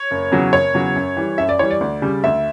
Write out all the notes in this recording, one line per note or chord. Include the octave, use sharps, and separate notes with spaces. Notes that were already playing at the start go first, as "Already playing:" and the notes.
Already playing: C#5
F#1
E2 C#3 F#3
F#1 C#5
E2 C#3 F#3
F#2
E3 G3
F#2 E5
D5
E3 G3 C#5
D5
D2
C#3 G3
D2 E5